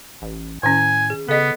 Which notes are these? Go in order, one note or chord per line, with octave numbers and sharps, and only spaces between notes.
A1
A2 D#3 C#4 G#5
G#4
C#3 B3 A4 D#5